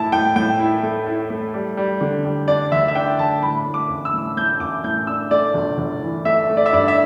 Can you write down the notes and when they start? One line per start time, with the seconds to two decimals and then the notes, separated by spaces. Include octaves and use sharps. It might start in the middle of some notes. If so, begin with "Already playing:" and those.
Already playing: A2 E4 A5
0.12 A2 G5
0.36 A2 G5
0.59 E4
0.83 A3
1.07 E4
1.30 A3
1.54 G3
1.77 G3
2.01 D3
2.25 G3
2.48 D4 D5
2.72 D2 E5
2.88 E5
2.95 D4 G5
3.18 D2 A5
3.42 A2 B5
3.66 A2
3.74 D6
3.89 A1
4.05 E6
4.13 A2
4.37 A2 G6
4.60 A1 D6
4.84 A2 G6
5.07 D4 E6
5.31 A3 D5
5.54 G1
5.78 G1
6.02 E3
6.25 A3 E5
6.49 A3
6.57 D5
6.66 E5
6.73 G2 D5
6.88 E5